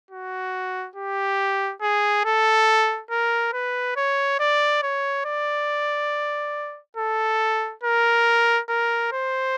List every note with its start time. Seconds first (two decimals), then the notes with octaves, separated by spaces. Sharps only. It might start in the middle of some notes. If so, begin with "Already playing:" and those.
0.11 F#4
0.96 G4
1.82 G#4
2.25 A4
3.11 A#4
3.53 B4
3.96 C#5
4.39 D5
4.83 C#5
5.25 D5
6.97 A4
7.84 A#4
8.69 A#4
9.12 C5